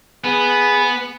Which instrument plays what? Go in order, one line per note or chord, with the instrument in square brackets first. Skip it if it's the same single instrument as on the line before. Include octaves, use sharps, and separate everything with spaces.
[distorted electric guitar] B3 [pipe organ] G#4 B4